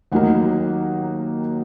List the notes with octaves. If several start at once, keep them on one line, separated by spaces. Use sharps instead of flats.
D#2 D#3 F#3 A#3 D#4 F#5